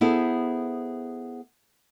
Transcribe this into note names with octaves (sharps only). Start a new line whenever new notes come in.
B3 E4 G#4 A4 C5